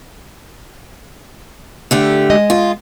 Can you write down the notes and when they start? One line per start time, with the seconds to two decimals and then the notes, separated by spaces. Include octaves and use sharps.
1.91 D3 A3 G4
2.30 G#3 D#5
2.50 F4